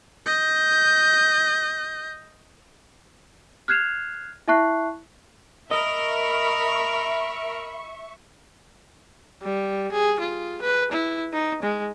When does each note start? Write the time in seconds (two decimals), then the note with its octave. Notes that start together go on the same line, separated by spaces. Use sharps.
0.26 D#5 G6
3.68 F6 F#6 G#6 C7 E7 F7
4.48 E4 E5 A5 C#6 F#6 C7
5.71 A#4 D#5 E5 B5 C#6
9.42 G3
9.92 G#4
10.20 F4
10.62 B4
10.92 E4
11.33 D#4
11.63 G#3